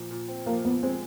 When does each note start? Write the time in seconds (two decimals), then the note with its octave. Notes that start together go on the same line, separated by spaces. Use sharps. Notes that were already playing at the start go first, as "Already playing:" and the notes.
Already playing: A#2 F3
0.11 A#2
0.28 C4
0.46 F3 A#3
0.65 F3 B3
0.83 G#3 C4